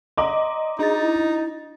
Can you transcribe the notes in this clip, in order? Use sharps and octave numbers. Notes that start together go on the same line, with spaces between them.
D5 D#5 A#5 C6 D6
D4 D#4 G#4 A6
E4